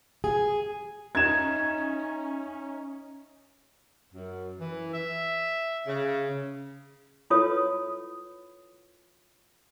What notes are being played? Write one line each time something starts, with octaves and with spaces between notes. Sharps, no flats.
G#4
C#4 D#4 D#5 E5 G#6 E7
F#2
E3
E5
C#3
E4 F4 A4 B4 C#5 D#6